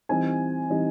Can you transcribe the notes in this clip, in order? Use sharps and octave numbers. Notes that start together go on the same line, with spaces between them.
E3 G3 C4 D#4 G#5
E3 G3 C4 D#4